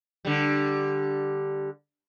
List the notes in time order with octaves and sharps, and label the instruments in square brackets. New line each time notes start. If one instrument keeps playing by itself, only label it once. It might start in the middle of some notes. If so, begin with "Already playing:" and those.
[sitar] D3 G3